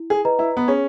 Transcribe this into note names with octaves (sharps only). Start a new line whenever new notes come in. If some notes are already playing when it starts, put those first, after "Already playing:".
Already playing: E4
G#4
B4 D#5 A#5
E4
B3
C#4 G#4